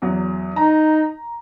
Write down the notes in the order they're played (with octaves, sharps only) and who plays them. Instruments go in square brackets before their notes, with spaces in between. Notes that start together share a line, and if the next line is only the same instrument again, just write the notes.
[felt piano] E2 F#3
[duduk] D#4 [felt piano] A#5